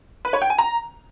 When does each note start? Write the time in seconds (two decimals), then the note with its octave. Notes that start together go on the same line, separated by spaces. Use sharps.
0.25 B4
0.33 C#5
0.42 G5
0.50 G#5
0.58 A#5